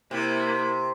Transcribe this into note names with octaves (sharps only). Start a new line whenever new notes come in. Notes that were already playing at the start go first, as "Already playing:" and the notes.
C3 A#3 E4